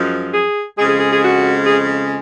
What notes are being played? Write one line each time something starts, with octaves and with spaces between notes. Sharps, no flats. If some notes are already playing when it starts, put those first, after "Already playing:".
Already playing: F#2 F3 G#3
G#4
F2 C#3 G#3 G#4
G#4
G#4
G#4
F#4
G#4